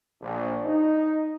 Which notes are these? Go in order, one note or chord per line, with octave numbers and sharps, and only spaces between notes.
A#1
D#4